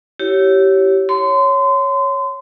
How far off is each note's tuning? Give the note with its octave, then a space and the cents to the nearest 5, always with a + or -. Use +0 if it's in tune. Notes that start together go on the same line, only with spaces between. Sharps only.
E4 +0 G4 -25 C#5 +0
C#5 +0 C6 -30